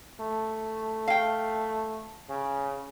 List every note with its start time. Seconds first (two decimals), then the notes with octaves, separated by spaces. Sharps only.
0.20 A3
1.08 F5 G5
2.29 C#3